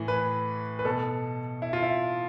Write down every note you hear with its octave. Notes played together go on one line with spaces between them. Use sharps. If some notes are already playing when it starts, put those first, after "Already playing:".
Already playing: A2 E3
B4
B4
B2 A4
E4
F4
E4